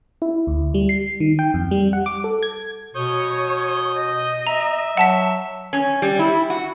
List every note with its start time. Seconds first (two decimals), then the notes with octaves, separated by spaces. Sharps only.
0.22 E4
0.47 D2
0.74 G3
0.89 C7
1.20 D#3
1.39 G5
1.54 F2
1.71 G3
1.93 F#5
2.06 D6
2.24 A4
2.43 G#6
2.95 B2 C#5 D#6 G6
3.96 D#5
4.47 E5 A#5
4.97 F#3 F#5 A5 B6
5.73 C#4
6.02 G3
6.19 E4
6.50 F#4